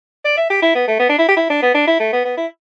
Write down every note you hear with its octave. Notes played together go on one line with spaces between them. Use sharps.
D5
E5
G4
E4
B3
A3
B3
D4
E4
G4
E4
D4
B3
D4
E4
A3
B3
B3
E4